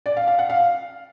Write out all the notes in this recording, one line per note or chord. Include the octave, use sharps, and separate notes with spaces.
D5
F5
F5
F#5
F5